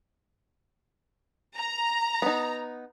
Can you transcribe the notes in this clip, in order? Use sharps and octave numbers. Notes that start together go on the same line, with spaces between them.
A#5
B3 D#4